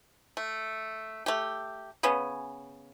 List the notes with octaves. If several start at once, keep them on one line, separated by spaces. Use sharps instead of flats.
A3
A3 G4
C#3 B3 C#4